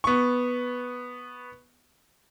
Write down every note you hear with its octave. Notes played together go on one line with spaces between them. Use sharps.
B3 C#6